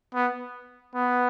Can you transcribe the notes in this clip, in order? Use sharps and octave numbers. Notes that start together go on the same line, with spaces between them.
B3
B3